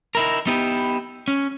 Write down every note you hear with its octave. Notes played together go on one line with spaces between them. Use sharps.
D#4 E4 A#4
B3 D#4 E4 G4 B4
C#4